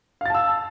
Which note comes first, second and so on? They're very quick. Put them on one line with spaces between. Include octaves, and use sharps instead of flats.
F5 A6 A5 E6